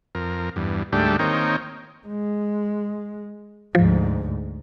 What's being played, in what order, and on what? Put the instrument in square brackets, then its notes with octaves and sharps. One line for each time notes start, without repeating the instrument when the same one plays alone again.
[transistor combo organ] F2 A#4
E2 G2
D2 G#2 G3 A3 D4 G4
D#3 A#3 C4 D#4 C#5 G5
[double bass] G#3
[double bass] D2 G#2 [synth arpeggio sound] F3